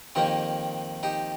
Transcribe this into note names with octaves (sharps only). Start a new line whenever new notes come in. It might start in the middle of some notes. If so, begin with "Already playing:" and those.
F2 D#3 A#3 D#4 G4
D#4 G4